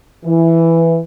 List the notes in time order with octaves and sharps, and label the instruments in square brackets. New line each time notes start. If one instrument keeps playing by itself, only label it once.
[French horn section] E3